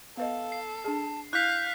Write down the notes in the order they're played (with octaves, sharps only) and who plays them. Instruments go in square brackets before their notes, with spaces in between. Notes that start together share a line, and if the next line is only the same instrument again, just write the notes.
[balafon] B3 B4 D#5 [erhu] A4 [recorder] F5
[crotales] C7
[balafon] D4 G#4 [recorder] A5
[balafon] E4 [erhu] F5 [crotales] F#6 B6 [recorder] G6